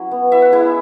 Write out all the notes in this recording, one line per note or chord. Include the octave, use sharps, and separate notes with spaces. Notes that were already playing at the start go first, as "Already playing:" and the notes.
Already playing: F#3 C#4 E4
B3
E4 E5
F#5
G#3 E4 E5